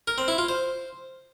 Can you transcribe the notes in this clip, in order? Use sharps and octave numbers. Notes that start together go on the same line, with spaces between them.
A#4
C4
E4
F4
C5